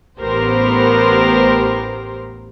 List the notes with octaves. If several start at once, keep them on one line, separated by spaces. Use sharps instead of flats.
A1 B3 G4 A#4 C5